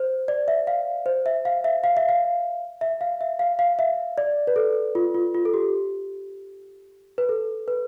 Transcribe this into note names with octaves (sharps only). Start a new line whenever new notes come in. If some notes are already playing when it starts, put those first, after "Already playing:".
Already playing: C5
D5
E5
F5
C5
E5
F5
E5
F5
E5
F5
E5
F5
E5
F5
F5
E5
D5
B4
A4
F4
F4
F4
A4
G4
B4
A4
B4